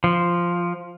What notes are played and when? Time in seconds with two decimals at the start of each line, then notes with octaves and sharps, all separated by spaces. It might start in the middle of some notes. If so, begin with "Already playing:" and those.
0.04 F3